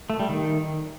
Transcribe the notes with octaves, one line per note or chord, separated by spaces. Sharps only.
A3
G3
D#3